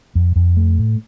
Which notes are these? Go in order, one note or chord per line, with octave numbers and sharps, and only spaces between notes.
F2
F2
A3
A2